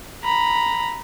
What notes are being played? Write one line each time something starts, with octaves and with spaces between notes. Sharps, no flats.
A#5 B5